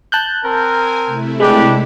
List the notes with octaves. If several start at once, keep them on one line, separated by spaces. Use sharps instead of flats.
A5 F#6 G6
C4 A#4 G#5
C3 A3 E4
G#3 D4 G4 B4